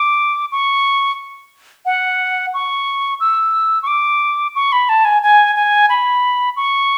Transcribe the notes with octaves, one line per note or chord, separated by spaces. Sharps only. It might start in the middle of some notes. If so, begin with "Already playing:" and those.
Already playing: D6
C#6
F#5
C#6
E6
C#6
D6
C#6
B5
A5
G#5
G#5
G#5
B5
C#6